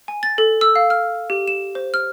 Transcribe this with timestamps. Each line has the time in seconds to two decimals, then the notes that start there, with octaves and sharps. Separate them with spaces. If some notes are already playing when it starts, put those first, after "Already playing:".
0.08 G#5
0.23 A6
0.38 A4
0.61 E6
0.76 F5
0.90 F6
1.30 G4
1.47 E7
1.75 C5
1.94 F6